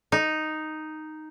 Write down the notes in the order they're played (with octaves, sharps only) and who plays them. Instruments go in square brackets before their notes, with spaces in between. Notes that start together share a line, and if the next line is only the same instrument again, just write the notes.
[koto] D#4